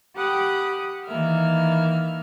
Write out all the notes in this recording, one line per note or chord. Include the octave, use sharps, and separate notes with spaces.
G4 F#5 B5 D#6
D#3 E3 A#3 E5 F6